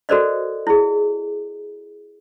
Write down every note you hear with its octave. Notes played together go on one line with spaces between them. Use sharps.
F#4 A4 A#4 C5 D5 D#5
E4 G#4